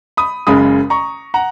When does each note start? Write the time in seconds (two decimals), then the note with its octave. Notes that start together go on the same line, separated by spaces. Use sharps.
0.17 B5 D#6
0.47 F#1 F#2 C#3 G#3 B5 D#6
0.90 A#5 C#6
1.34 F#5 A#5